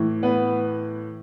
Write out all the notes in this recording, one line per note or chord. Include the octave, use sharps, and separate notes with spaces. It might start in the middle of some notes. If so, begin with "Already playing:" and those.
Already playing: A2 E3
B3 B4